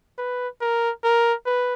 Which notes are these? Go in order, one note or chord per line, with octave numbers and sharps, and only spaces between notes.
B4
A#4
A#4
B4